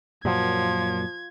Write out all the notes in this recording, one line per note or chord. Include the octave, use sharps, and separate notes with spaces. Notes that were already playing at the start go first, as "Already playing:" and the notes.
F#2 A#2 F3 F#3 G#6